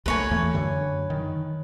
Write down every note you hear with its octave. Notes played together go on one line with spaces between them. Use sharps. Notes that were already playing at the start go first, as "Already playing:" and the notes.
C2 A3 A#3 B4 C#5 G#5
E2 E3 A3
F#2 D3
D#3